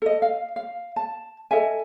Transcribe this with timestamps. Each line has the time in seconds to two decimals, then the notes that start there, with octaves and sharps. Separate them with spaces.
0.02 A4 D#5
0.22 F5
0.56 F5
0.96 A5
1.51 A4 D#5 E5 G#5